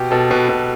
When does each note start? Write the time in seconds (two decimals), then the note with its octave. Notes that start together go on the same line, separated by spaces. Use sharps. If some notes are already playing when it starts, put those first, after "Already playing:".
Already playing: B2 G4
0.11 B2 A4
0.30 B2 B4
0.49 B2 A4